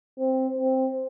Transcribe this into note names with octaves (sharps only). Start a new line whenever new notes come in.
C4
C4